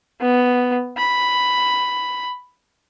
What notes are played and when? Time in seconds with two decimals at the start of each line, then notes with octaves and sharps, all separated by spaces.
0.21 B3
0.97 B5